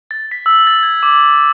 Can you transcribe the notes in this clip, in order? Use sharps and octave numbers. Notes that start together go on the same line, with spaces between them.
A6
B6
E6
A6
G#6
D6